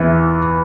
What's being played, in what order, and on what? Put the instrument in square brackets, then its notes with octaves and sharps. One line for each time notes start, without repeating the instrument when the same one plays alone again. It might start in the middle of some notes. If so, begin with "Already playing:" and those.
Already playing: [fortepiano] E2 E3 B3